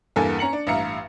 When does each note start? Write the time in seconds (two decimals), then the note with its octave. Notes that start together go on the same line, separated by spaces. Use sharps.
0.16 E2 G2 A#3 A4 G#5
0.39 C#4 A#5 C#7 F#7
0.53 D4
0.67 A1 G2 E5 F5 A#5 C#7